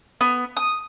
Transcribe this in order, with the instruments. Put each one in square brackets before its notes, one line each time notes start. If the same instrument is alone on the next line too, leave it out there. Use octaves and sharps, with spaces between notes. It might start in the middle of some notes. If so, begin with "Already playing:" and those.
[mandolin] B3
D#6